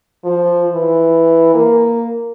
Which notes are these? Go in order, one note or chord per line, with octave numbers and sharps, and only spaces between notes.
F3
E3
A#3